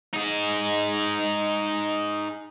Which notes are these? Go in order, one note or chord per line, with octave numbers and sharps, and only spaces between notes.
D#4 G#4